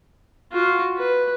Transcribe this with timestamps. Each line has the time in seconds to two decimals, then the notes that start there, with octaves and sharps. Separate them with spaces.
0.53 F4 F#4
0.97 B4